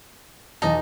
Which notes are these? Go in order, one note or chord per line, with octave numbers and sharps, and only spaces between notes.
B1 E2 D#4 D#5 A5